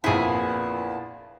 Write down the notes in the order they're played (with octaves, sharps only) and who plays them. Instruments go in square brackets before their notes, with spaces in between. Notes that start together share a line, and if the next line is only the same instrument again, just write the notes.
[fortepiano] A#1 F2 [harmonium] A#2 B3 A5 [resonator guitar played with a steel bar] E4 G#4